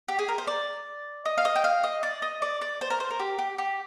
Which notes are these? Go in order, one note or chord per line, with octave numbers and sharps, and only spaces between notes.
G4
G#4
A#4
C5
D5
D#5
F5
D#5
G5
F5
D#5
D5
D#5
D5
D5
C5
A#4
C5
A#4
G4
G4
G4